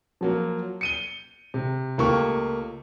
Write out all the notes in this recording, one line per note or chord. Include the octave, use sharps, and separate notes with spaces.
F3 F#3 A#3
C#7 D#7 G7
C3
C#2 A3 A#3 F4 G4 C#6